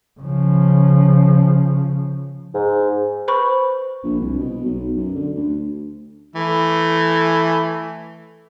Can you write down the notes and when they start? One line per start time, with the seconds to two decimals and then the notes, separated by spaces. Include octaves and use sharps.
0.20 C#3 F3
2.54 G#2
3.28 B4 C5 B5 C#6
4.04 A#1
4.20 C2
4.38 B2
4.65 B1
4.96 F#2
5.15 D3
5.35 D2
6.36 E3 A3